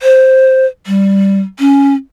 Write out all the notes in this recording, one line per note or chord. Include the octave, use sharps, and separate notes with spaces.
C5
G3
C#4